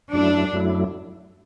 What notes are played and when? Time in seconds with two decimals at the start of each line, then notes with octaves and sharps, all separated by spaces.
0.13 F#2 F#3 A3 D4 E4
0.53 F#2 F#3 A3 E4